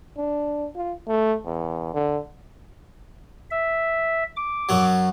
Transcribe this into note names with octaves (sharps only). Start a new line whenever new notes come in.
D4
F4
A3
E2
D3
E5
D6
F#2 F#3